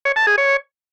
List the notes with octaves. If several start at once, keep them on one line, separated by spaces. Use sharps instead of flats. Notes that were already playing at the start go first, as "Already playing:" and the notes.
C#5
A5
G#4
C#5